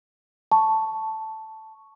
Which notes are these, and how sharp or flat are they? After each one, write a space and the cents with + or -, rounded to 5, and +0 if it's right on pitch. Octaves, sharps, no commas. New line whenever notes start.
A5 +0 C#6 +0